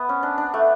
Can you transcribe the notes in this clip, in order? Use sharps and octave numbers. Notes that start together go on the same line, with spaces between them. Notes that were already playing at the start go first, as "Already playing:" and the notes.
Already playing: B3
C#4
D4
D4
A3